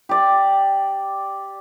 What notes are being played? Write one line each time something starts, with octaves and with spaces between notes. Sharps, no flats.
G4 D5